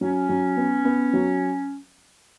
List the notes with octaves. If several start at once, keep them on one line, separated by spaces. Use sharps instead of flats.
F#3 C#4
F#3
B3
B3
F#3